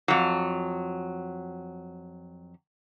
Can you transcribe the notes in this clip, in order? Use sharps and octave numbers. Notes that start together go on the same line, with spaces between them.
F2 F#3